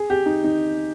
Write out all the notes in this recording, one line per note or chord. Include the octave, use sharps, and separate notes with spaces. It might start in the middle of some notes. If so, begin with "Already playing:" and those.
Already playing: G#4
G4
D#4
D#4